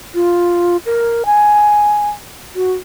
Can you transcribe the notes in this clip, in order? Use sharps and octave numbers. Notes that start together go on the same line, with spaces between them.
F4
A#4
G#5
F#4